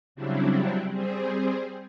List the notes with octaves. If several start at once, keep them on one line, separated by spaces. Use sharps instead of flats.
C#3 F#3 G3 C4 D4 E4
G3 C4 G#4 C5